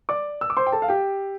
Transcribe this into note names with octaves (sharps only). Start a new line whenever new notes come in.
D5 D6
E6
D6
C5 C6
G5
A4 A5
F5
G4 G5